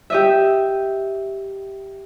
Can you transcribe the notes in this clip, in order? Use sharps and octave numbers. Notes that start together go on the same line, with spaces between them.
G4 D#5 E5